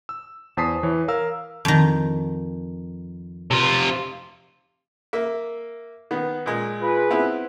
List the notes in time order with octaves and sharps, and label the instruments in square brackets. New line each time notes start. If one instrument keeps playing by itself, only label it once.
[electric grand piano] E6
E2 C5 A5 D#6 B6 C7
E3 C#5
A#4 F5 E6
[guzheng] F2 D#3
[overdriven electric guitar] C3 F4
[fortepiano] A#3 E5
D#3 B3
A#2 G#3
[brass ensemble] F4 G#4 B4
[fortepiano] B3 C4 E4